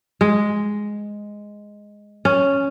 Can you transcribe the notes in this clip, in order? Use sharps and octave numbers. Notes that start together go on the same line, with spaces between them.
G#3
C#4